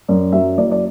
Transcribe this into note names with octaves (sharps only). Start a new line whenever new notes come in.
F#2 D5
F#3 E5
F#1 D5
D5